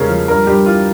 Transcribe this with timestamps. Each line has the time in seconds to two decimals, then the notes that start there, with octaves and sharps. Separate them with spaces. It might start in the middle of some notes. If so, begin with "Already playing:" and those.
Already playing: E2 C#3 G3 G#3 A#4 C#5
0.09 F3
0.28 G2 A#4
0.46 G2 G4
0.65 E3 F4